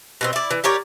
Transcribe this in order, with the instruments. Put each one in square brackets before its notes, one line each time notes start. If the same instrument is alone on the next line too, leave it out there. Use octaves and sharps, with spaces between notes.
[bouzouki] B2 B3 C4
E4 D5
E3
G4 A#4 C#5 D5